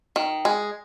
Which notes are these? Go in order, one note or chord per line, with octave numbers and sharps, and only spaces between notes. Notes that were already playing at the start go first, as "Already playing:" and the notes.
D#3
G#3